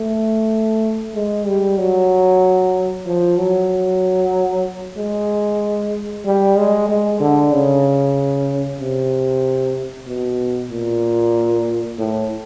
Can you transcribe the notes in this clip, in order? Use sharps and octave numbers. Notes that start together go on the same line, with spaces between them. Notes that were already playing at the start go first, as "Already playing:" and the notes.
Already playing: A3
G#3
G3
F#3
F3
F#3
G#3
G3
G#3
G#3
D3
C#3
C3
B2
A#2
A2